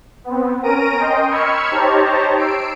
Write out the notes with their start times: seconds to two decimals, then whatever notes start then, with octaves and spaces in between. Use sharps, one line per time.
0.24 B3 C4
0.63 C#4 A#4 A#5 A#6 D7 D#7
0.97 D#5 G5 C6
1.30 B5 C#6 E6 F6 G#6 C#7
1.71 D#4 G4 C5 C#5 A5 A#5
2.37 E6 C7 D7